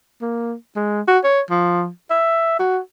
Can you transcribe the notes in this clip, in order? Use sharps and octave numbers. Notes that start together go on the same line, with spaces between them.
A#3
G#3
F#4
C#5
F3
E5
F#4